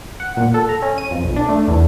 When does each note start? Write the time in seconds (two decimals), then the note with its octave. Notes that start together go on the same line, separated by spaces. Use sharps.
0.20 F#5
0.37 A#2
0.54 A4
0.69 A#5
0.82 C#4
0.98 D#7
1.11 F2
1.24 B1
1.36 D4
1.49 A3
1.68 E2